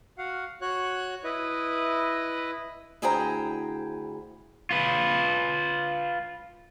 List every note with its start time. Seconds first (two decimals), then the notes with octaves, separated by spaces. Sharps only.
0.18 F#4 F5 F#5
0.61 F#4 C#5 F#6
1.24 E4 B4 D#5
3.02 D2 E4 G#4 C5 G5 A#5
4.71 F4 B4